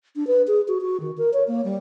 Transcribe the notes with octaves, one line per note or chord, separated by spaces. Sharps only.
D4
B4
G#4
F#4
F#4
D#3
A#4
C#5
A#3
G3